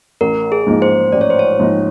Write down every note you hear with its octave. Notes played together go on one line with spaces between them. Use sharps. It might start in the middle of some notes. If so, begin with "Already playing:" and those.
A1 A#4
G#4
G#2 F3 A#3 D#4
C5
A1 D5
C#5
C5
C#5
G#2 F3 A#3 D#4